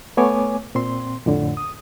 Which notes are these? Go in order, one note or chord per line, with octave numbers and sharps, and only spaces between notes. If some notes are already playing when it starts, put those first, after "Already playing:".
A3 B3 C#5 G#5 D6
A#2 C4 C6
F2 A2 D3
D#6